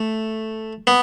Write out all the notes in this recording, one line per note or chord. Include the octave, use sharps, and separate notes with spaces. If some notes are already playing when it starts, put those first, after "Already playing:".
Already playing: A3
B3